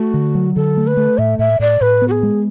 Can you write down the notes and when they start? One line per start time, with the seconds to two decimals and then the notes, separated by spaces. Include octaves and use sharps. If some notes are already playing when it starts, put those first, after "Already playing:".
Already playing: A3 F#4
0.14 D3
0.35 F#3
0.56 D3 A4
0.77 A3
0.87 B4
0.97 A3
1.18 A2 E5
1.39 A2 E5
1.60 A2 D5
1.81 A2 B4
2.02 B3
2.08 F#4
2.11 G#4
2.23 G#3